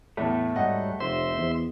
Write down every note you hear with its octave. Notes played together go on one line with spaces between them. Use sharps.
E2 A2 A3
G#2 F#3 G3 D#5 F#5
F1 C5 E5 C6
E2